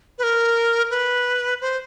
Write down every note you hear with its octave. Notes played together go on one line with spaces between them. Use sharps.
B4
A#4
B4
C5